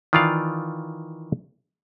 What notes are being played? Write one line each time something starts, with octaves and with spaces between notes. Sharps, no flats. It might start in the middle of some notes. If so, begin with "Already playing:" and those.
D#3 E3 F4 D5 F5